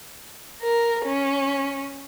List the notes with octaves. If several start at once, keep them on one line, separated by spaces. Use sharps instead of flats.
A#4
C#4